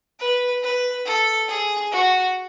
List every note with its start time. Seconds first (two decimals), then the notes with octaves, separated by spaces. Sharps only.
0.20 B4
0.63 B4
1.06 A4
1.48 G#4
1.92 F#4